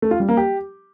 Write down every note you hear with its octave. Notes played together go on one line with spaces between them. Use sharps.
A3
F4
G3
A#3
G4